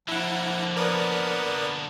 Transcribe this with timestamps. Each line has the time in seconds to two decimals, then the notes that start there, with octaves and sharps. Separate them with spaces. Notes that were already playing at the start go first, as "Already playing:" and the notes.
0.08 D3 F3 A#3 E4 F#5
0.77 B3 A#4 D5 D#6